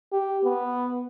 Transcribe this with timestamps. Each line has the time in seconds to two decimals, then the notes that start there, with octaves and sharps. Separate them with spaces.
0.12 G4
0.44 B3